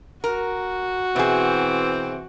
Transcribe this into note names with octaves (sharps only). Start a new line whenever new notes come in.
F#4 A#4
B2 E3 C4 G#4